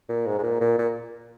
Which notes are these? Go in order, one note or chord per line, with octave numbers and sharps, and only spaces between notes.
A#2
G#2
G#2
A#2
A#2
A#2